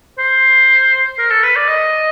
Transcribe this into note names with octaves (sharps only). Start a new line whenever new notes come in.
C5
A#4
A4
B4
D5
D#5